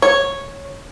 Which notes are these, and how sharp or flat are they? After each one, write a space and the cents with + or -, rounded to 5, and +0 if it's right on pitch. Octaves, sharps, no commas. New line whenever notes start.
C#5 -5